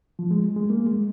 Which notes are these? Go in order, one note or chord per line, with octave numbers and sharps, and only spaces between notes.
F3
G#3
G#3
A#3
G#3